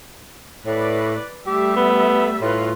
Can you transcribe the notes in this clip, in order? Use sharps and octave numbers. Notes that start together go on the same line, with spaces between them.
A2 B4 D5
G3 A3 G4 E5
B3
A2 F4 B4